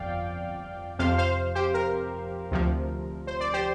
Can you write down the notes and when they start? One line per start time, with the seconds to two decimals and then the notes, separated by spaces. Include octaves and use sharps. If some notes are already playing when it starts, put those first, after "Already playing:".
Already playing: G1 F2 F3 D5 F5 G5
0.99 F2 C3 F3 C5 F5
1.18 C5 F5
1.55 G4 C5
1.74 A#4
2.51 D2 C3 F3
3.27 C5
3.41 D5
3.54 G4 C5